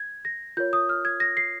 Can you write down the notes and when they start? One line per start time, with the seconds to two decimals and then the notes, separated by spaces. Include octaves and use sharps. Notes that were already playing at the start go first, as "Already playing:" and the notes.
Already playing: G#6
0.25 A#6
0.57 F4 A#4 C#5 G6
0.73 D#6
0.89 F6
1.05 G#6
1.20 A#6
1.37 C7